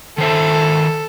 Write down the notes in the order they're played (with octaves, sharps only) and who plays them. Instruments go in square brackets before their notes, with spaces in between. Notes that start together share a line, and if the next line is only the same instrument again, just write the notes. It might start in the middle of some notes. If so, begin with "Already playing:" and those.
[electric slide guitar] D#3 C5 E5 [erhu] A4